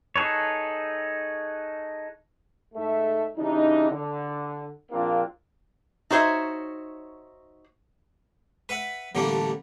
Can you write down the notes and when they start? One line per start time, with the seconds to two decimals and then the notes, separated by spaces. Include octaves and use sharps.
0.16 D#4 G#4 A4 B4 C#5
2.74 G#2 A3 A4 E5
3.37 C#3 E3 G3 D4 D#4
3.89 D3
4.92 A#1 A#3 C4 D4 F4 F5
6.10 D#4 F#4 C5 C#5 E5
8.69 B4 E5 F#5
9.15 A1 D3 G3 A3 A#3